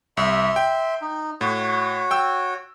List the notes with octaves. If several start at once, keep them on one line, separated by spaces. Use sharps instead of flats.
C2 E5 C6
G5
D#4
A2 F#4 C#5
G5 E6